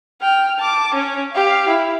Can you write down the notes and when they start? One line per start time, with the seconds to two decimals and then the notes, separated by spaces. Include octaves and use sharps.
0.22 G5 F6
0.59 A5 D6
0.94 C#4 C#5
1.32 G4 F5
1.69 E4